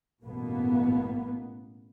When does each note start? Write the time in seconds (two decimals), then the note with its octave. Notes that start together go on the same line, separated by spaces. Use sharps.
0.23 A1 G2 B2 A#3 B3